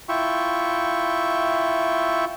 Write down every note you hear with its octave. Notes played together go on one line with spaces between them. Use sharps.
E4 F4 E5 G5 C#6